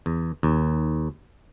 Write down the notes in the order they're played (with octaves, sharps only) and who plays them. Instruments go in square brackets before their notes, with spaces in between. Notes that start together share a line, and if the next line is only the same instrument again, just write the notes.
[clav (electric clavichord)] E2
D#2